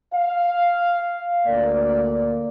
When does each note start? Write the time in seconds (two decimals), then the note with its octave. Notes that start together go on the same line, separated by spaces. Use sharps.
0.14 F5
1.47 D2 A#3 D5